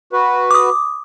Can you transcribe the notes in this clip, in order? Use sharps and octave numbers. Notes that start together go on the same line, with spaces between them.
F#4 B4
D6 D#6